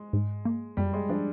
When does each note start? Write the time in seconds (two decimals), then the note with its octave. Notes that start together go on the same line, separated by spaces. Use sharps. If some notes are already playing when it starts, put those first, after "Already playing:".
Already playing: G#3
0.13 G#2
0.45 A#3
0.77 F#2 G3
0.93 G#3
1.09 F3 D4